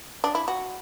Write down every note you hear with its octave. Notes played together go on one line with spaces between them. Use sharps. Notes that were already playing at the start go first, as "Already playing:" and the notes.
D4
E4
F#4